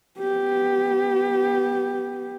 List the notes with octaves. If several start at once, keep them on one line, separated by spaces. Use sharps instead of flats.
B3 G4